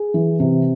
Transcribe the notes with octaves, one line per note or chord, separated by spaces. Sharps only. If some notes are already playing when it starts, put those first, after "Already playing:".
Already playing: G#4
E3
C3